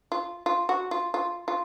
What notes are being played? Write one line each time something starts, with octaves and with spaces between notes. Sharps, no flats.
F4
F4
F#4
F4
F4
F4